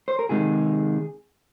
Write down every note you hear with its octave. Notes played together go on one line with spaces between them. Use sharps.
C5
A#4
C3 D#3 G#3 G#4